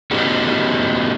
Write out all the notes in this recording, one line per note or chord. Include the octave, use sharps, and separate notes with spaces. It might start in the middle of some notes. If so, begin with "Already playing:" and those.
A3 B3 C#4 D#4 F#4 G4